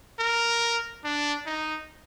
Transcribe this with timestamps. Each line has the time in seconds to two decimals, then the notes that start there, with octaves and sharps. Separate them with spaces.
0.19 A#4
1.04 D4
1.46 D#4